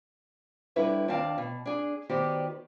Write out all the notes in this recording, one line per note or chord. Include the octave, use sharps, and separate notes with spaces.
D3 G3 E4 A#4 B4 C#5
D#2 C4 D4 F5 A5
B2
D4 G#4
D#3 B3 F#4 G4 C5 D5